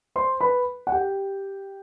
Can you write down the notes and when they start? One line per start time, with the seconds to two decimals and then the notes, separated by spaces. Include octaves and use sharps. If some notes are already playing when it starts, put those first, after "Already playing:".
0.16 C5 C6
0.41 B4 B5
0.87 F#5
0.92 G4 G5